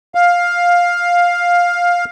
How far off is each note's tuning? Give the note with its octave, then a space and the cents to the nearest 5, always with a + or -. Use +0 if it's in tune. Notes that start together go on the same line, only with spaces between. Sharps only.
F5 +10